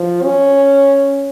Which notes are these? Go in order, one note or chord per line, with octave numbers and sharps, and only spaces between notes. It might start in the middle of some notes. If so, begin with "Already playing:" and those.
Already playing: F3
C#4